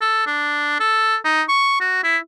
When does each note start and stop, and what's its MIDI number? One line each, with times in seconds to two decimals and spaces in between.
0.01 0.24 69
0.26 0.79 62
0.80 1.16 69
1.24 1.42 63
1.48 1.76 85
1.81 2.01 66
2.04 2.17 64